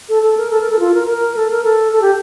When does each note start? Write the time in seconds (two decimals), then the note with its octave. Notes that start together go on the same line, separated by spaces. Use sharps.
0.09 A4
0.23 A4
0.37 A#4
0.51 A4
0.60 A#4
0.70 A4
0.79 F4
0.94 A#4
1.07 A#4
1.36 A4
1.50 A#4
1.64 A4
1.92 A4
2.01 G4